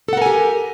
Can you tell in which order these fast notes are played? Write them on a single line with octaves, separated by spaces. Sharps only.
A4 F#5 A#4 G#5 G4